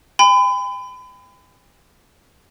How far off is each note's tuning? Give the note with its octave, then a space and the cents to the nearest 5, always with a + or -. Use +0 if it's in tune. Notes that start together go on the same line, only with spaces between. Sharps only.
G5 +45 B5 +35